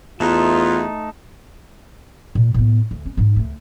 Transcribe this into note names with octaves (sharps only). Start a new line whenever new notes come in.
E2 A3 D#4 F4
A#2
A2 B3
D2
C#4
G#2 D#4
D2 A3